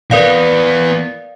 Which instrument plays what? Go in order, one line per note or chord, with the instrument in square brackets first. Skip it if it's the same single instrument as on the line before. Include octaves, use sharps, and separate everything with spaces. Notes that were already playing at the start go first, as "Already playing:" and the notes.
[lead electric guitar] E3 B3 [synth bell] A#4 D5 F5